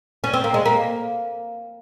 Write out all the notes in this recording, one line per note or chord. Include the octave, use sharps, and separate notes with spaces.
C#4
C4
A#3
G#3
A#3